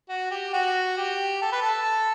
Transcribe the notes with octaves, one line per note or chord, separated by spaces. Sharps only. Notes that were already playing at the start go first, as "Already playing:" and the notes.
F#4
G4
F#4
G4
A4
B4
A4